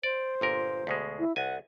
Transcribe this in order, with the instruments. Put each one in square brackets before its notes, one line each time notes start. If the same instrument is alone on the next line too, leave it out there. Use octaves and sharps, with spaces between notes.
[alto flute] C5 [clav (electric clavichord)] D5
[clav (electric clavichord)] G1 A#2 A#4
D2 B2 G#3
[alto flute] E4
[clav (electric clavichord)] C2 G#5 [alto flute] F#5